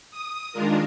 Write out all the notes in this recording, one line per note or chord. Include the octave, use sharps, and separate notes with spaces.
D#6
D#3 G#3 D4 F4 A#4